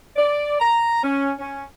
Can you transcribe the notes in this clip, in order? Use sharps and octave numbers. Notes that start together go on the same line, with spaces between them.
D5
A#5
C#4
C#4